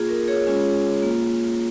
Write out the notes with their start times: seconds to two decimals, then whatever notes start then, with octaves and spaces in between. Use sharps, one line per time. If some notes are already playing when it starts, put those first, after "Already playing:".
Already playing: A#3 F4 G#4
0.09 A#4
0.28 G#4 C#5
0.47 G#3 C#4 F4
1.02 A#3 F4